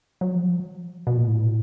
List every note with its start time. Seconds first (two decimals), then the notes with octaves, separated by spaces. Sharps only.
0.21 F#3
0.34 F3
0.43 F#3
0.48 F3
1.07 B2
1.17 A#2
1.27 A2